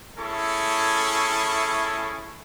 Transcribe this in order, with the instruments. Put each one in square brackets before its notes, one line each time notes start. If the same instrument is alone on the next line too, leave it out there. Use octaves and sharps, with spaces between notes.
[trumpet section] A3 C#4 E4 G#4 A4 C#6